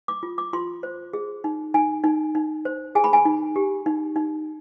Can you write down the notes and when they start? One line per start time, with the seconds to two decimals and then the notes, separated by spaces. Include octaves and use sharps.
0.08 D6
0.23 F4
0.38 D6
0.53 F4 C6
0.83 C5
1.13 G#4
1.44 D#4
1.74 D#4 G#5
2.04 D#4
2.35 D#4
2.65 C5
2.95 G#4 G#5
3.04 B5
3.13 G#5
3.25 D#4
3.56 G4
3.86 D#4
4.16 D#4